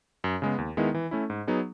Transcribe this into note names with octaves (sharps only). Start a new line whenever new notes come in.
F#2
C#3 G#3 B3
D#2
D#3 G#3 B3 E4
E3
A3 C#4 E4
G#2
F#3 B3 D#4 G#4